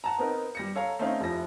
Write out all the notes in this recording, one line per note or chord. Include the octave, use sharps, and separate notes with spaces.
F#5 A5 A#5
B3 C4 D#4 A#4
G3 A#6 C#7
A4 C#5 F5 A#5
A3 C4 C#4 D#4 F5
F1 F3 E4 A#6